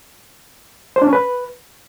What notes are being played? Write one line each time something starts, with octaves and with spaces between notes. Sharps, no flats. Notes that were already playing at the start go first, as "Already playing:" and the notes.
C5
D4
C#4
B4